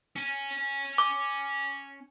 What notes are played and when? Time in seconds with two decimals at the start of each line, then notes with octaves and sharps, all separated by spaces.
0.16 C#4 G#5
0.98 D6